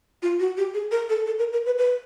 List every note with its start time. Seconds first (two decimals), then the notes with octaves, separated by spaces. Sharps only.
0.22 F4
0.40 F#4
0.57 G4
0.74 G#4
0.91 A#4
1.10 A4
1.26 A4
1.39 A#4
1.53 A#4
1.66 B4
1.78 B4